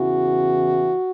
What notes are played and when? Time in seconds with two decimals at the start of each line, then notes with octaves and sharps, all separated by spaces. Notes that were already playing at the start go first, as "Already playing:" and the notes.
Already playing: E2 C#3 E3 F#4